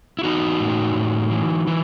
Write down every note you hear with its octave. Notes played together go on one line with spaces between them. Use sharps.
E4
E3 D#4 F#4
A2
A2
E3
E3